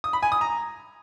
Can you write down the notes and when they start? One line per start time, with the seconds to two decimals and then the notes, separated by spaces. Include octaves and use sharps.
0.04 D#6
0.13 B5
0.23 G#5
0.32 D#6
0.41 A#5